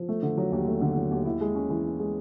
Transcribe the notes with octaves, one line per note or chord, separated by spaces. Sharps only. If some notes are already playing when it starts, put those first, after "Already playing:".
Already playing: F3
A3
D3
F#3
D#2
A3
D3
F#3
D#2
E4
G#3
C#4
E3
E4
G#3